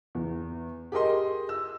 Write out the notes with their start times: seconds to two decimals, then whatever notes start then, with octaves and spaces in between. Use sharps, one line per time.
0.15 E2
0.92 G4 G#4 A#4 D#5 C6
1.49 E6